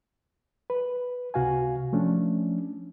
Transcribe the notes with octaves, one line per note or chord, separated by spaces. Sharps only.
B4
C#2 C3 F#4 F5 G#5
F3 A3 C#4 D4